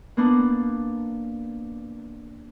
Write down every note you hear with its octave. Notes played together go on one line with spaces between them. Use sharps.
A#3 B3 D4